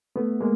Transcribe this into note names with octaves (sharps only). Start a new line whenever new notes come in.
A3 B3
G#3 A#3